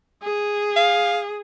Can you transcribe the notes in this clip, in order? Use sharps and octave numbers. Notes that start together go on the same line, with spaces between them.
G#4
F5